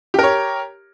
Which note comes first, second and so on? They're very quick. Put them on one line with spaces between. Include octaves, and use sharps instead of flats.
G4 A#4 C#5